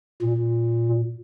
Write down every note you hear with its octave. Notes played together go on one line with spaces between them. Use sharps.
A#2